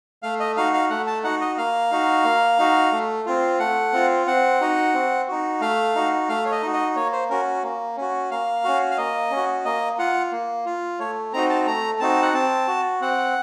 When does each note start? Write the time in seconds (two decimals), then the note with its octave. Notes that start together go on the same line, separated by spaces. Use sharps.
0.23 A3 F5
0.40 D#5
0.57 D#4 F#4 F5
0.73 F5
0.90 A3 F#5
1.07 A5
1.24 D#4 F#4 F#5
1.41 D#5
1.58 A#3 F5
1.91 D#4 F#4
2.24 A#3
2.59 D#4 F#4
2.92 A3
3.26 C4 F4
3.59 A3 F#5
3.93 C4 F4
4.27 C4 F#5
4.61 D#4 F#4
4.94 C4
5.27 D#4 F#4
5.61 A3 F5
5.95 D#4 F#4
6.29 A3 F5
6.45 C#5
6.51 D#5
6.62 D#4 F#4
6.73 D#5
6.96 A#3 C#5
7.12 C5
7.30 C#4 F#4 A#4
7.63 A#3
7.97 C#4 F#4
8.31 A#3 F5
8.64 C#4 F#4
8.91 F5
8.97 A#3 D#5
9.31 C#4
9.36 F#4
9.65 A#3 D#5
9.98 F4 F#5
10.32 A#3
10.66 F4
10.99 A3 C#5
11.33 C4 D#4 F#4 A#5
11.50 A5
11.67 A3 A#5
12.00 C4 D#4 F#4 A5
12.22 F#5
12.34 C4 A5
12.68 F#4
13.01 C4 F#5